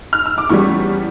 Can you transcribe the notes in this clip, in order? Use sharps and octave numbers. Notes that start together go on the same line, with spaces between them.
F6
E6
D6
E2 E3 G3 C#4 C#6